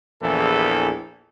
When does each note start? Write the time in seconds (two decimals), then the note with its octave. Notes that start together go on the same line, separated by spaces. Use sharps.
0.22 A#1 E2 E3 A4